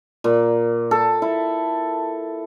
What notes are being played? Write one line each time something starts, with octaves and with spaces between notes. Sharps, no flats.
A#2
A4
E4